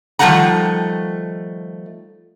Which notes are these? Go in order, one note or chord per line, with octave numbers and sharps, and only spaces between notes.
D#3 F3 G3 A3 F#5 A#5